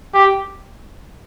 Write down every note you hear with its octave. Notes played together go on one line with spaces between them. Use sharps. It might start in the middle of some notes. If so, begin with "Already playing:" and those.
G4